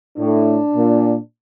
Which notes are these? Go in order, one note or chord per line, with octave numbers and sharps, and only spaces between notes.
A2 D4
A#2